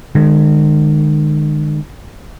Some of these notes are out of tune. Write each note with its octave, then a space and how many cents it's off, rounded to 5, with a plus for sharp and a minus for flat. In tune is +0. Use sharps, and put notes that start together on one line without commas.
D#3 -45 G#3 +0